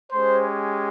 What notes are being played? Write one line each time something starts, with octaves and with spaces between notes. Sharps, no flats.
G#3 C#4 G4 C5